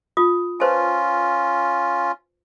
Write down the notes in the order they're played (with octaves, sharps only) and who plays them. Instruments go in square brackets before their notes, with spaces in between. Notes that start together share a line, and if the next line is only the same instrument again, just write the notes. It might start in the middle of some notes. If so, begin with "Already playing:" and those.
[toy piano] F4 D#6
[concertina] C#4 F4 [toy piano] B4 C5 A5